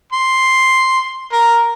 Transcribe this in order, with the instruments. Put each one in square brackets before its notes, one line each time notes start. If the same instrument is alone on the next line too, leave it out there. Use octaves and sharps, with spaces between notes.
[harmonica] C6
A#4